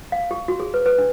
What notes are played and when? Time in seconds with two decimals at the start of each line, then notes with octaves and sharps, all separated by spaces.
0.12 F5
0.31 G4
0.48 F#4
0.60 G#4
0.74 B4
0.86 B4
0.98 D4